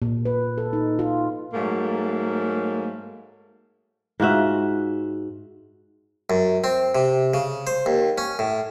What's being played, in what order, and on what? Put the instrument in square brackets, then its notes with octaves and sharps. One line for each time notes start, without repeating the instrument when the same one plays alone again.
[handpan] A#2
B4
A4
D#4
F4
[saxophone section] G#2 F#3 A3 A#3
[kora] G#2 F4 F#4 E5
[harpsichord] F#2
C4
C3
C#3
C5
D#2
C#4
A2